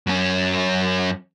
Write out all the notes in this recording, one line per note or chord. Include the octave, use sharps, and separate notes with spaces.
F#2 C#4